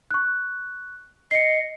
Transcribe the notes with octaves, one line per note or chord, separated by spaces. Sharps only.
C#6 F#6
D#5 C7 C#7